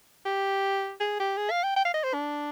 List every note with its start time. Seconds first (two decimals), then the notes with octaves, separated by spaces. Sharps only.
0.25 G4
1.00 G#4
1.20 G4
1.37 G#4
1.51 F5
1.63 G5
1.76 G5
1.85 F5
1.94 D#5
2.04 C5
2.14 D4